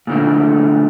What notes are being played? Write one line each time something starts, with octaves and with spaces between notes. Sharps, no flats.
A#2 D3 A3